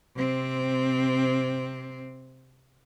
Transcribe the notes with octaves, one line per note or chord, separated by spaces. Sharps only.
C3 C4